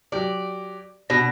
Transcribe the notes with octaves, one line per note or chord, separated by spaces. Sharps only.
F#3 G4 D5
B2 D4 A#6